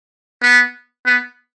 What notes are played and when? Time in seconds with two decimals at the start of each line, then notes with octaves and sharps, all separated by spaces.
0.42 B3
1.06 B3